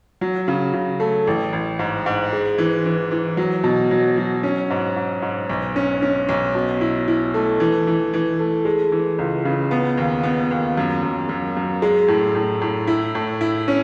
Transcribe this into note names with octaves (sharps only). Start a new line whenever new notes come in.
F#3
C#3
C#3
A3
A1
A1
G#2
G#2
G#3
E3
E3
E3
F#3
B2
F#3
F#3
C#4
G#2
G#2
G#2
B1
C#4
C#4
B1
B2
E4
E4
A3
E3
E3
E3
A3
G#3
E3
C#2
C#3
B3
D#2
B3
D#2
F#2
F#2
F#2
F#2
G#3
A2
A2
A2
E4
A2
E4
C#4